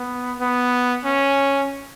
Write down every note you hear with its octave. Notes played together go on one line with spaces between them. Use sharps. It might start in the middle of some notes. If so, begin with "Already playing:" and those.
Already playing: B3
B3
C#4